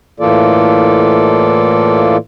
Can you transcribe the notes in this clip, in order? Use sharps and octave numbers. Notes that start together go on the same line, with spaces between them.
A2 E3 A#3 F4 A4 D5